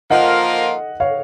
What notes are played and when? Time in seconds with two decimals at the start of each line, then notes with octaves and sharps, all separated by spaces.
0.10 F3 A#3 F4 A#4 D#5 F#5
1.00 C#5 F5